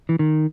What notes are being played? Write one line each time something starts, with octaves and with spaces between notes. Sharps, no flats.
E3
D#3